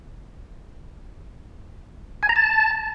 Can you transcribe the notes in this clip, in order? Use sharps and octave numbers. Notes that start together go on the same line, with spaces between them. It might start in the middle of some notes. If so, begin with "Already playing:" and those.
G#5
A#5
A5